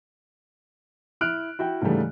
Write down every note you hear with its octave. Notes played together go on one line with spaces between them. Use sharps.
E4 F6 F#6 D7
E4 F#4 G5
G#2 C#3 E3 G3 A3